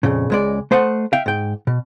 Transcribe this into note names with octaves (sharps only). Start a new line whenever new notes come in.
F2 A#2 C#3
C#2 G#3 D5
A3 C5 D#5 F#5
E5 F5 G5
G#2 G5
B2